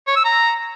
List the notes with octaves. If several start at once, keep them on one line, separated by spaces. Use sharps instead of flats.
C#5
E6
A#5